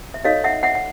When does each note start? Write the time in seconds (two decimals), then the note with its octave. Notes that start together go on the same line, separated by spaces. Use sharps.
0.14 E5
0.25 D#4 F#4 A4 C#5 D#5 F5
0.44 E5 F#5
0.63 E5 F#5
0.75 F#5